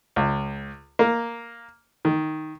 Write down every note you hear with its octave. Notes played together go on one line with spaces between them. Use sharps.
C#2
A#3
D#3